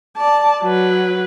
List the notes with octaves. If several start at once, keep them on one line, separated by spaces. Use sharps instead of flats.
D5 A5
F#3 B4